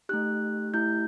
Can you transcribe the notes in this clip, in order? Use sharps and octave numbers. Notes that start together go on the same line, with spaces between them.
A3 D#4 G4 F#6
A3 E4 G4 G6